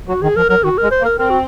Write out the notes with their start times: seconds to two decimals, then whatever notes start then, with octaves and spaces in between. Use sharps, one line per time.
0.08 F#3 F#4
0.22 D#3 G#4
0.36 F3 A#4
0.50 F#3 A#4
0.63 D#3 F#4
0.78 A#4
0.83 G#3
0.91 C5
1.01 A#3
1.05 A#4
1.19 C4 A#4
1.30 F#4